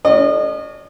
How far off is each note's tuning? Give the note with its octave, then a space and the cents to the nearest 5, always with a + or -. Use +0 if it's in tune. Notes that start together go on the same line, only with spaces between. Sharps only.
C#4 +30 A4 +0 D#5 -35